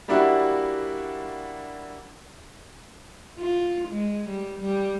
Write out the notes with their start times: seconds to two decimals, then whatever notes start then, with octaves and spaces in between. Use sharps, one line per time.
0.08 G3 A#3 D4 E4 F#4
3.39 F4
3.89 G#3
4.29 G3
4.60 G3